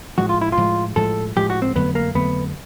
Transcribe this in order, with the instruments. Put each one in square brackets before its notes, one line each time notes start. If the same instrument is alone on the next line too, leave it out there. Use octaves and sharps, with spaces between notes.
[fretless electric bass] A2 F3 G#3 [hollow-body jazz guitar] F#4
[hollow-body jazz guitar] F4
E4
F4
[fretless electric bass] A2 F3 G#3
[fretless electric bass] A2 F3 G#3 [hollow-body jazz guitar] A4
[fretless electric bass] A2 F3 G#3 [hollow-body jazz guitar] G4
[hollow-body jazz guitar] F#4
C4
[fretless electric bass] F2 D3 F#3 A3 [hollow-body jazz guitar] B3
[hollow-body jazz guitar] A#3
[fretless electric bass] F2 D3 F#3 A3 [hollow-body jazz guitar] B3